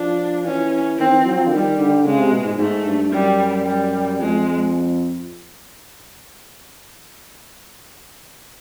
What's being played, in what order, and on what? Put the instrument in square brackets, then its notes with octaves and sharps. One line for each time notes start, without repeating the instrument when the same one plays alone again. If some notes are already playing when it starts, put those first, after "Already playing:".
Already playing: [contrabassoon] F3 [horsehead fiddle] D4
[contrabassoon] E3 [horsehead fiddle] C#4
[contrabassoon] D#3 [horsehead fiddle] C4
[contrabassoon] E3
F#3
F3
D3
[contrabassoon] D#3 [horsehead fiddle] G3
[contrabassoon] D3
[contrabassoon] C#3 [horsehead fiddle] G#3
[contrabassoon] C3
B2
G#2
[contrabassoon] G#2 [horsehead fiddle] A3
[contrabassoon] G2
[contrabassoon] F#2 [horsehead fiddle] G3
[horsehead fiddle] G3
[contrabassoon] F2 [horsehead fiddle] G#3